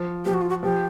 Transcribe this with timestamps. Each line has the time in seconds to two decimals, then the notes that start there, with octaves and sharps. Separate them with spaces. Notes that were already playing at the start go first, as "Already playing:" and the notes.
Already playing: F3
0.25 F3 G4
0.34 F#4
0.41 F4
0.50 F#4
0.63 F3 G4